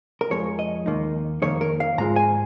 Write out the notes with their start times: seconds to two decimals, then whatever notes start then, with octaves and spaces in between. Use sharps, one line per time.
0.21 A#4
0.30 F2 F3 G#3 C#5
0.59 D#5
0.86 D#2 D#3 A#3 D#4
1.42 F2 D#3 A#3 D#4 C#5
1.61 A#4
1.80 F5
1.98 G#2 G#3 F4 A#5
2.16 G#5